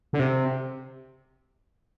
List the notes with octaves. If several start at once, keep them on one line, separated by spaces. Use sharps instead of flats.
D3
C3